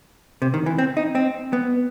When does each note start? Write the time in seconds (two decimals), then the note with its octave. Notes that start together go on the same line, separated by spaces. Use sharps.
0.42 C3
0.54 D#3
0.66 E3
0.78 C4
0.97 D#4
1.15 C4
1.53 B3